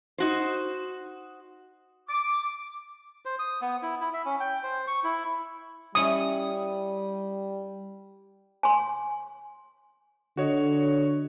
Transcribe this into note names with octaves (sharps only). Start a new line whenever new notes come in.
D#4 F#4 C5
D6
C5
D#6
B3
E4
E4
E5
C#4
G5
C5
C#6
E4
G3 C#4 E4 C#5 D#6
G#5 C6
D3 F#4 C#5 D#5